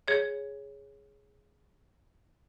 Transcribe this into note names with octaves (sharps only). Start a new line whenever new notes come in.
G#4 C#5